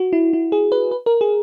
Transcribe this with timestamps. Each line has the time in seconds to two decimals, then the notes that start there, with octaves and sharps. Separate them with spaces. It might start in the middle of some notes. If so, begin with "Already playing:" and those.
Already playing: F#4
0.13 E4
0.33 E4
0.52 G#4
0.72 B4
0.91 B4
1.06 A#4
1.21 G#4